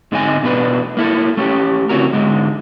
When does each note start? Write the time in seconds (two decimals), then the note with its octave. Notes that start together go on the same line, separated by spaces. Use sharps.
0.12 G#2 D3 G#3 C4 D#4 G#5
0.43 E2 B2 A3 D4 B4
0.97 A#3 E4 A4
1.37 A3 C#4 G4
1.89 C#3 C4 C#4 E4 F#4 A#4
2.13 G#2 D3 G#3